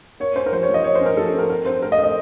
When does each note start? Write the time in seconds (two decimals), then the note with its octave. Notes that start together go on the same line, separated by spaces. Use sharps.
0.20 A#3 C#5
0.36 C#4 C5
0.46 A#4
0.52 F3 C5
0.63 C#5
0.69 F3
0.74 D#5
0.84 A#3 C#5
0.95 C5
1.01 C#4
1.06 A#4
1.17 F3 A4
1.27 A4
1.33 C#4
1.39 A#4
1.50 C4 A#4
1.65 C4 C5
1.82 A3 A#4
1.92 D#5
1.98 A3
2.04 D#5